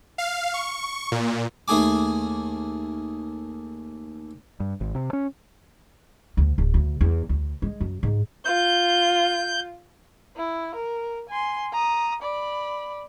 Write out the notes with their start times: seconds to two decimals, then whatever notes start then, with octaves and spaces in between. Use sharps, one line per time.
0.18 F5
0.54 C#6
1.12 A#2
1.68 D#2 A3 G#4 G#5 D6
4.60 G2
4.81 G#1
4.95 C3
5.13 C#4
6.37 D2
6.58 D1
6.74 D2
7.01 E2
7.29 D2
7.62 G#3
7.80 F#2
8.03 G#2
8.45 F4 G6
10.37 E4
10.75 A#4
11.29 G#5 C6
11.72 A#5 D#6
12.22 D5 B5